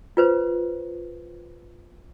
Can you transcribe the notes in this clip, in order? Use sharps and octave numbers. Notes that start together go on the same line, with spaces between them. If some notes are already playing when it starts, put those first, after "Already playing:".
F4 B4 C5